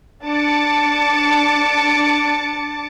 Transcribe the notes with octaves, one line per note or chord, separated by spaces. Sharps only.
D4 A5 D6 A6 C#7